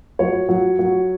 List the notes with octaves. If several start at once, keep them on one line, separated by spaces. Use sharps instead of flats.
F#3 C#5
F#3
F#3